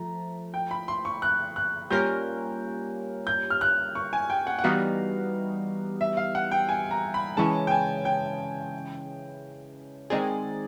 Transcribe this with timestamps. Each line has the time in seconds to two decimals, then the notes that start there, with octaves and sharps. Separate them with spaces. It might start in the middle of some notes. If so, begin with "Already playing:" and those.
Already playing: F3 A3 A#5
0.54 G5
0.71 B5
0.88 C6
1.05 C#6
1.22 F#6
1.56 F#6
1.90 G3 A#3 C#4 F4 A#4 G6
3.27 G6
3.50 F6
3.61 F#6
3.95 C#6
4.13 G#5
4.30 G5
4.47 F#5
4.59 F#5
4.64 E3 G3 B3 D#4 F#4 F5
6.01 E5
6.17 F5
6.35 F#5
6.51 G5
6.69 G#5
6.91 A#5
7.14 B5
7.37 C#3 E3 G#3 C#4 E4 A5
7.67 G5
7.71 G#5
8.05 G5
10.10 D#3 G#3 C4 D#4 G#4 D5